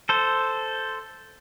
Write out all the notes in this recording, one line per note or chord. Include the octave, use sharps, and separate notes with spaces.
A4 C5